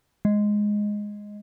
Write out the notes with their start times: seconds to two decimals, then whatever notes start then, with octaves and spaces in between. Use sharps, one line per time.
0.25 G#3